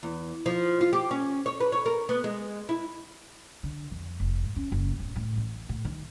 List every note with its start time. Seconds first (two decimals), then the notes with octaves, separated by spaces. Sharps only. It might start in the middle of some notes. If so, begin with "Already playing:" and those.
0.03 E2
0.46 F3
0.81 F4
0.93 G4
1.11 C#4
1.46 C#5
1.60 B4
1.72 C#5
1.86 A#4
2.09 B3
2.24 G#3
2.69 E4
3.63 D3
3.91 F2
4.20 F1
4.43 G#2
4.56 C#4
4.72 F#1
4.99 D1
5.16 A2
5.37 A1
5.69 A2
5.85 D#3